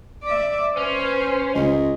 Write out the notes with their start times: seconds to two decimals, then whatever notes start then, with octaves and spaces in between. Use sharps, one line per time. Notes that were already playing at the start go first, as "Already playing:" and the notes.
0.24 D5 E5
0.77 C#4 B4 C5
1.54 C#2 D#5